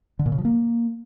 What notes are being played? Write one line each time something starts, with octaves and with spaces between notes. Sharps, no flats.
D3
A#2
C#3
F3
A#3